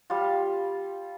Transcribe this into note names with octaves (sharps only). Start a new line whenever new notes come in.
G3 F4